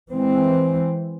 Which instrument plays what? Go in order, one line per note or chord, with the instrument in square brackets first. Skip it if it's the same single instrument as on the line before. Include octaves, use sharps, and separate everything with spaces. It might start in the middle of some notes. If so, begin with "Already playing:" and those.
[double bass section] E3 G#3 C4